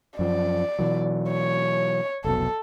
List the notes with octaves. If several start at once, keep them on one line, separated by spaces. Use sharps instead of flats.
F#2 F3 D5
B2 E3 F#3
C#5
F1 B1 B2 A4